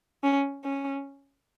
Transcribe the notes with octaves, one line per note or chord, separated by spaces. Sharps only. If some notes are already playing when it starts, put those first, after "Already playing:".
C#4
C#4